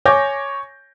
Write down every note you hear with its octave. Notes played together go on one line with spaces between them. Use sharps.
C#5 G#5 C#6 D6 G6 A#6